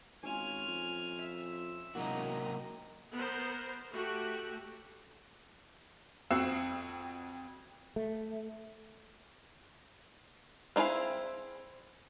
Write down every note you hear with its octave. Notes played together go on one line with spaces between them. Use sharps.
G#1 C#4 F4 G#5 F6
F2
E5
E1 C3 F#3 A#3 F#4 D#5 A#5
B3 A#4 C5
A3 F#4 G4
F2 C4 F#4 E6 C7 E7
A3
C4 D#4 E4 G#4 F5